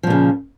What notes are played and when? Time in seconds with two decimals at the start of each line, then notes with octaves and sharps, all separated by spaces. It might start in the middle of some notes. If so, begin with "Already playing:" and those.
0.03 F3
0.07 A#2
0.10 C#3